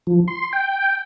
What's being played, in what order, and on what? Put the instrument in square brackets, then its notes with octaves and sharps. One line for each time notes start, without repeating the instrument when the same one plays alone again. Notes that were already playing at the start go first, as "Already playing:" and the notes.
[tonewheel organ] F3
C6
G5